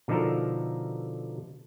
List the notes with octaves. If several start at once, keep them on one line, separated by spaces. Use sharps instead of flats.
B2 D3 F3 D#4 A4 A#4